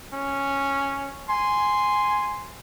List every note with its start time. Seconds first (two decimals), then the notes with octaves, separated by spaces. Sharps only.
0.13 C#4
1.29 G#5 C6